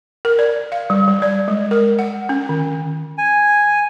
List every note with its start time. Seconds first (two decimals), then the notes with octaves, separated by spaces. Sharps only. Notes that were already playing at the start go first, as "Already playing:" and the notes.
0.25 A#4
0.39 D5
0.72 F5
0.90 G3
1.08 G3
1.22 D5
1.48 G#3
1.71 A#4
1.99 F#5
2.29 C#4
2.49 D#3
3.18 G#5